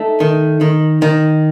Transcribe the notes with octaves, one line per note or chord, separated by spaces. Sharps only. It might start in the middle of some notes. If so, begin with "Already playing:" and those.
Already playing: A3 D#4
D#3
D#3
D#3